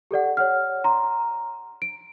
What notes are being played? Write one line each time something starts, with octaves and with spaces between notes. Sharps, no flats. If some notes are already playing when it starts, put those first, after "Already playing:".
G4 A4 D5 F#5
C#5 F#5 F6
A#5 C6
D7